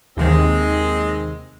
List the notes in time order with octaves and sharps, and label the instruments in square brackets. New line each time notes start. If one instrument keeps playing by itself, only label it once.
[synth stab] D#2 C3 D#3 [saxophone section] G#3 C4